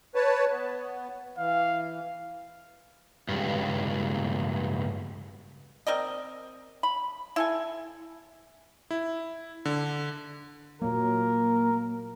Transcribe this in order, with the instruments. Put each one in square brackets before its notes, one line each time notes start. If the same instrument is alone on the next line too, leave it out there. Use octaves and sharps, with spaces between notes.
[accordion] B4 C#5 A5
B3
[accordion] E3 [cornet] F5
[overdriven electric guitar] C#2 G2
[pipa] C4 A#4 D5 D#5
B5
E4 A4 G#5
[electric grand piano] E4
D3
[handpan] A#2 F#3 [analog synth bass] A#3 [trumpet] A#4